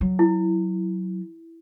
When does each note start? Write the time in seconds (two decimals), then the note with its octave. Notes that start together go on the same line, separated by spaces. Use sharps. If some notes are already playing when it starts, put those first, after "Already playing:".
0.01 F#3
0.19 E4